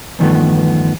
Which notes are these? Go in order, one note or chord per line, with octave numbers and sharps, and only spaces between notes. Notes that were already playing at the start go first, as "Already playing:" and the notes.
E2 G2 D#3 F3 A3 B3